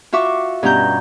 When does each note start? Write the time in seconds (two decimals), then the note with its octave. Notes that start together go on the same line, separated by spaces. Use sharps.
0.13 F4 F#4 E5 C#6 D6
0.63 G2 B2 C#4 A#5 G6